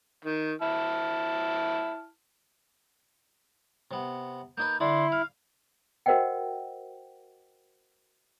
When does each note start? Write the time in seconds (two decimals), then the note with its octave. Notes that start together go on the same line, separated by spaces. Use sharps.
0.25 D#3
0.62 E4 A5 F6
3.91 C3 B3
4.58 A#3 D#4 B4 G6
4.80 D3 D4 E4 C6
5.12 F5 F6
6.06 F#4 A#4 C5 D#5 F#5 G5